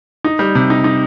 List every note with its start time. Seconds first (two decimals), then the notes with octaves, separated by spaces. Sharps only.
0.24 D#4
0.39 G3
0.55 C3
0.70 D#4
0.84 D#4